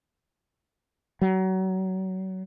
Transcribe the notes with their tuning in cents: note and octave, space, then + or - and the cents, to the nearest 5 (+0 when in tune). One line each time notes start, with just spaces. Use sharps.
F#3 +30